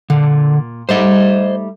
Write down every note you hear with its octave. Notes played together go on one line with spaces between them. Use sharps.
A#2 D3
G3 A3 D#4 C5 D#5